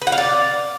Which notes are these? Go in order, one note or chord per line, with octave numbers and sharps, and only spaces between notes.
B4
F#5
F5
D5